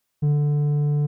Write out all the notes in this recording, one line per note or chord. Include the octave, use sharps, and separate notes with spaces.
D3